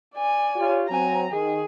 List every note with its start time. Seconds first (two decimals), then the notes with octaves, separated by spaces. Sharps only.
0.15 D5 G#5
0.55 F4 G4 C#5
0.89 F#3 C4 G#5 A#5
1.31 D#3 G#4